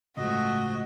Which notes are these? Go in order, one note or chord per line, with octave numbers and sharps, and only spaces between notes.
G1 A2 C#3 F3 G#3 A3 F#4 D#5